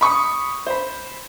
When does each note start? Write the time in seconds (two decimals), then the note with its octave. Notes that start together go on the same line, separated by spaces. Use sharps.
0.01 B5 C#6 D#6
0.67 C5 B5